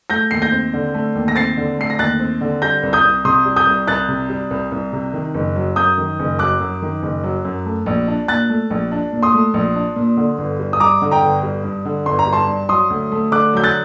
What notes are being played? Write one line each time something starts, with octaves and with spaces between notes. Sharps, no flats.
A3 G6 A#6
D#2 C7
G6 A#6
C4
D3
A3
D#2
A#6
C4 A6 C7
D3
A3 C7
A#6
D#2 F#6 A6
C4
D3
G3 G6 A#6
C2
D#6 G6
C2
C3 C6 D#6
G3
D#6 G6
C2
C2 F#6 A6
C3
G3
C2
C2
C3
D#3
F#1
F#3
F#2 D#6 G6
D#3
F#1
F#3 D6 F#6
F#2
D#3
F#1
F#3
F#2
A3
A#1
D4
A#2 F#6 A6
A3
A#1
D4
A#2
C6 D#6
A3
A#1
D4
A#2
D3
G1
G3
D#6
G2 A#5 D6
D3
G5 A#5
G1
G3
G2
D3
G1 C6
A#5
G3
A5 C6
G2
F#3 C6 D#6
D2
A3
D3 D6 F#6
F#3 G6
F#6 A6